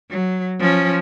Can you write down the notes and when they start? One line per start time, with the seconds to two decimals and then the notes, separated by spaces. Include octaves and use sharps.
0.10 F#3
0.59 F3 C#4